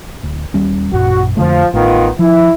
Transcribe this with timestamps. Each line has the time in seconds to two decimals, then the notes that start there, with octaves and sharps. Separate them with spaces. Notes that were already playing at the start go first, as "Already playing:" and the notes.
0.23 D1
0.54 D#1 G3 C#4
0.92 A1 F#2 A#2 F#4
1.37 F2 D3 F3 A3
1.73 A1 A2 D#3 A3 B3 F4
2.19 F3 E4